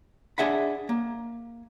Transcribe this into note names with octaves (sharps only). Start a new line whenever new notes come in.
D4 G#4 E5 F#5 B5
A#3